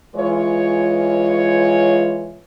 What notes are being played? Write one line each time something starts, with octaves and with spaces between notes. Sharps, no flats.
E3 G#3 F4 B4 C#5